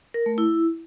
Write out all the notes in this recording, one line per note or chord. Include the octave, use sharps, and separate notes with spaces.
A#4
A3
E4